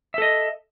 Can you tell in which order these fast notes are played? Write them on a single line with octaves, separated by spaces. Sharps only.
E5 A4 D#5